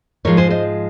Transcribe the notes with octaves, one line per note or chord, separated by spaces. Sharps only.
G#2 F3 G#3 A#4 C#5
G#4 C5
C5 D#5